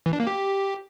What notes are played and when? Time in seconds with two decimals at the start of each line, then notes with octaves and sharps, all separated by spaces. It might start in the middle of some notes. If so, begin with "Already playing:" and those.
0.06 E3
0.13 D4
0.20 A#3
0.27 G4